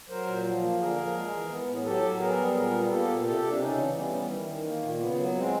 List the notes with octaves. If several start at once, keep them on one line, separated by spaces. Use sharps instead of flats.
F#3 A#4 C5
A#2
F3
A#3
D3 G#4 A#4
F3
G#3
E3
B3
A2
F#3 G4 A4
F#3
B3 G#4 A#4
G3
A#2 G#4 A#4
B3
A#3 G4 A4
A#2
C3 G4 A4
C3
D4
C#3 C#4 D#4
E3
G3 B3 C#4
E3
D#3
D#3
A#3
A#2
C#3 B3
F#3
G#3 C4